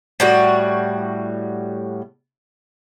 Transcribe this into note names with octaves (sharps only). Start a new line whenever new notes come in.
A2 G3 F#4